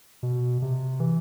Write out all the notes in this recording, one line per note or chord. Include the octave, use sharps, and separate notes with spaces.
B2
C3
E3